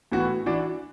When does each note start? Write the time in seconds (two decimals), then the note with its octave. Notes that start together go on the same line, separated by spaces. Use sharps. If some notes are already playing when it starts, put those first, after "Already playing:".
0.12 A2 E3 B3 F#4
0.46 E3 D4 F#4